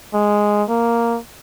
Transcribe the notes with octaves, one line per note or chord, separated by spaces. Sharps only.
G#3
A#3